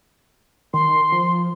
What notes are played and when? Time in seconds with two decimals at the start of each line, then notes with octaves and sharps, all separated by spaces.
0.74 D#3 C6
1.12 F3